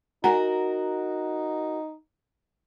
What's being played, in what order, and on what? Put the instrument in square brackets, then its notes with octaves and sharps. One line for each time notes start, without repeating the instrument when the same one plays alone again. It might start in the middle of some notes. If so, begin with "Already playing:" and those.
[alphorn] D#4 [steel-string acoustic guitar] F#4 A#4 [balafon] F#5 G#5 A#5